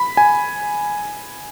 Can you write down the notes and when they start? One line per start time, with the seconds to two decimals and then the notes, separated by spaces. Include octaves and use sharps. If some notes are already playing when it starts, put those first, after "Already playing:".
Already playing: B5
0.17 G#5